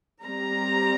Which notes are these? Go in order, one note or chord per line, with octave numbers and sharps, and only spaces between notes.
G3 C4 A#5